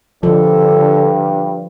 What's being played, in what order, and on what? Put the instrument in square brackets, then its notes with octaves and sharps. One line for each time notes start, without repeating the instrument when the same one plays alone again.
[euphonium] G2 [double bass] D3 [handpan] F3 [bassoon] A4